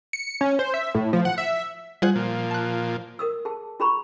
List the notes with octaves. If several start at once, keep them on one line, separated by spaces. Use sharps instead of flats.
C#7
C#4
C5
E5
A2
F3
F#5
E5
G3 F4 G#4 C5 F#5
A#2 F3
A5 F#6
A#4 D#6 E6
G#4 A5
F4 G#4 A#5 B5 C#6